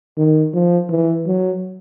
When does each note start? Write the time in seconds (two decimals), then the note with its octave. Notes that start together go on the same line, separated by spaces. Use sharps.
0.17 D#3
0.53 F3
0.89 E3
1.26 F#3